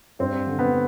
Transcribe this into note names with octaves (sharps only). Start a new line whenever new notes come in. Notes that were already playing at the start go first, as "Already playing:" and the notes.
G2 C4
D3
B3